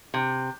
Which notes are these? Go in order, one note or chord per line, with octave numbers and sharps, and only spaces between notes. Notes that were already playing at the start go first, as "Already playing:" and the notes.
C3